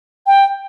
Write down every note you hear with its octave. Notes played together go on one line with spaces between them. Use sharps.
G5